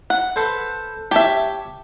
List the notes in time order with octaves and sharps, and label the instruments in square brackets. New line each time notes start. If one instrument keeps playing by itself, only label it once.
[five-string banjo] F#5
[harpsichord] A4 B4 C5
[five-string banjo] G4 E5 [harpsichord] C#5 A5